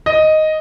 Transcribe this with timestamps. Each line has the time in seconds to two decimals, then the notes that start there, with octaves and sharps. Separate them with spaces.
0.06 D#5